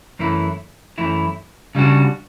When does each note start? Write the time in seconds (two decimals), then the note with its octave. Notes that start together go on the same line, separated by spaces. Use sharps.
0.19 F#2 E3 A3 E4
0.98 F#2 E3 A3 E4
1.75 C#3 G3 D4 F#4